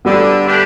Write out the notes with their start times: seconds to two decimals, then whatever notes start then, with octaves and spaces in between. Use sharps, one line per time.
0.05 D3 G3 B3
0.47 A3 D4 G4 B4